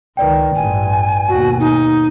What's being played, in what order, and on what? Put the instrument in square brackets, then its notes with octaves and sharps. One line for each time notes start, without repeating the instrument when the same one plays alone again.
[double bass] C#2 D#3 [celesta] B4 D5 G5
[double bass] A1 G2 [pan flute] G#5
[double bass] D#2 B2 [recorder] F#4
[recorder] D#4